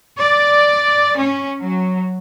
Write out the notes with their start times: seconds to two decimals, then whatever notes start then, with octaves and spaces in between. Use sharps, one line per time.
0.19 D5
1.18 C#4
1.60 F#3